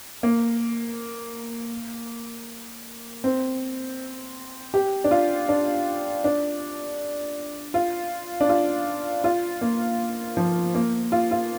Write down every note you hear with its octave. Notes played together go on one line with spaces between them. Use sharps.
A#3
C4
G4
D4
F4
D4
D4
F4
D4
F4
F4
A#3
F3
A#3
F4
F4